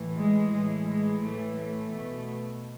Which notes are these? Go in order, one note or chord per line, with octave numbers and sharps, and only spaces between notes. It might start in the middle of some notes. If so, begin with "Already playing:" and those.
Already playing: A2 E3
G#3
A2 E3 G#3
G#3
A2 E3 A3
A3
B2